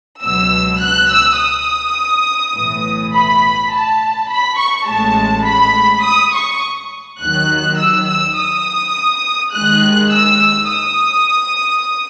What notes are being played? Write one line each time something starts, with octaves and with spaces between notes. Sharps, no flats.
C#2 B2 F#3 E6
F#6
E6
D#6
B1 A2 E3
B5
A5
B5
C#6
A1 A2 G#3 A5
B5
D#6
C#6
D#2 D#3 F#3 F#6
E6
E6
D#6
D#2 D#3 G#3 F#6
E6
D#6